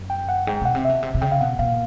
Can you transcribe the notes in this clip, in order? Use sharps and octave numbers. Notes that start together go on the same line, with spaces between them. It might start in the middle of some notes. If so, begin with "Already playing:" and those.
Already playing: F#2
G5
F#5
G#2 G5
G5
B2 F#5
C3
B2 E5
C3
C3
C#3 G5
F5
B2 F#5
A#2 F5